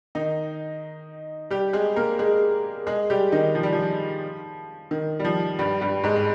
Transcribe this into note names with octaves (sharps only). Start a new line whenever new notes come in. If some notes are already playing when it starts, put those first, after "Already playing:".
D#3 D#4
G3 G4
G#3 G#4
A#3 A#4
G#3 G#4
G#3 G#4
G3 G4
D#3 D#4
F3
G3
F3
D#3
G3
F3
G2 G3
G2 G3
G#2 G#3
G#3